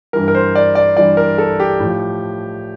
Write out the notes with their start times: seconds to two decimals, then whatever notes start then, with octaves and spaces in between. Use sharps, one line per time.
0.13 G2 E3 G3 A#4
0.28 A#4
0.35 C5
0.55 D5
0.75 D5
0.97 G2 E3 G3 D5
1.17 A#4
1.38 A4
1.60 G4
1.80 A2
1.85 F3